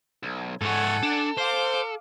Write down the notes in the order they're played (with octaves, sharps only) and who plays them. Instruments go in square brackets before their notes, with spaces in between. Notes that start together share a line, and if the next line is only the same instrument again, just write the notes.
[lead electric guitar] B1
[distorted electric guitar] G#2 C#5 [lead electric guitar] A4 [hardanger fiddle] F#5 G#5
[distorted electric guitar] D4
[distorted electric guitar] C5 [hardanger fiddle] F5 D6